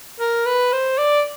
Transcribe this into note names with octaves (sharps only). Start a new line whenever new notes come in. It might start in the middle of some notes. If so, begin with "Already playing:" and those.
A#4
B4
C5
D5